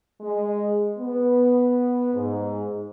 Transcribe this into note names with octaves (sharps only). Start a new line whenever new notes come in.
G#3
B3
G#2